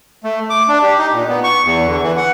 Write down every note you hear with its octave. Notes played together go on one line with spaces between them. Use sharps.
A3
D6
D4
G4
D#4
A#2
B3
C#6
E2
D3
E3
F#5